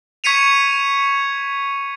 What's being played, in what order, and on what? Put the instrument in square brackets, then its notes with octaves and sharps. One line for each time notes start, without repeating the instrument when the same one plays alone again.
[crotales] C#6 G#6 B6 C#7 D#7 F7